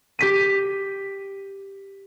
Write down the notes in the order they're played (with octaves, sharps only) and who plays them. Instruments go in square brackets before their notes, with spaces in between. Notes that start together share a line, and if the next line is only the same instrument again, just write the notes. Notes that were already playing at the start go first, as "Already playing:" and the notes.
[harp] G4 B6 D#7